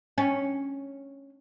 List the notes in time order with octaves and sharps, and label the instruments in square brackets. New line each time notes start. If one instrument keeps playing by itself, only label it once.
[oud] C#4